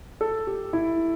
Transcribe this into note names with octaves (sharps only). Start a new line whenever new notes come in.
A4
G4
E4